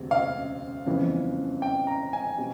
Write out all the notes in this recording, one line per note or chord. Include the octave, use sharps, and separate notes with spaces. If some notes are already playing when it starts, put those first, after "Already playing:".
Already playing: E1 D2 C3
F5
G1 F2 C#3 E3
G5
A#5
G#5
B2 G3 C4